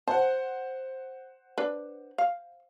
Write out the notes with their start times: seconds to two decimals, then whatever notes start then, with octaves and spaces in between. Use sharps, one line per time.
0.08 C5 F#5 A5
1.58 D4 B4
2.18 F5